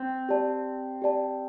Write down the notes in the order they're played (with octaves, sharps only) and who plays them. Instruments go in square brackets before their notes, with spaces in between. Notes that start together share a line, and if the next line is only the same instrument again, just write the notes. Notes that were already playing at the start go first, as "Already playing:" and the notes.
Already playing: [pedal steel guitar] C4
[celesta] G4 D5 A5
G4 D5 A5